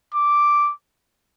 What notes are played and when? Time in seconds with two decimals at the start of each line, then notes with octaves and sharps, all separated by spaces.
0.14 D6